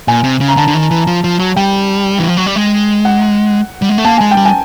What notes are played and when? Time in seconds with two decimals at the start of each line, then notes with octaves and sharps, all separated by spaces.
0.08 A#2 G#5
0.24 C3
0.41 C#3
0.48 A#5
0.57 D3 A5
0.68 D3
0.74 D#3
0.91 E3
1.07 F3
1.24 F3
1.39 F#3
1.56 G3 G5
2.19 E3
2.28 F3
2.37 F#3
2.46 G3
2.56 G#3
3.05 F#5
3.82 G3
3.89 G#3
3.98 A3
4.04 A#3 A5
4.18 G#3 G#5
4.31 G5
4.37 G3
4.45 G#5